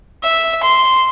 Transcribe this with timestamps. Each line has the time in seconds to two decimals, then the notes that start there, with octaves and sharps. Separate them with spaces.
0.23 E5
0.63 C6